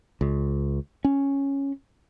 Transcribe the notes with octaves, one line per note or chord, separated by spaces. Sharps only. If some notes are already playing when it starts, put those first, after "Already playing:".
C#2
C#4